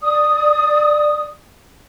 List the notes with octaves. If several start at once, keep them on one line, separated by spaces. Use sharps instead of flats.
D5 D#6